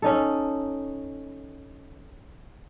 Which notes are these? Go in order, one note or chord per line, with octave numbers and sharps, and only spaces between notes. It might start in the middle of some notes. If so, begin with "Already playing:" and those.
C#4 D#4 A4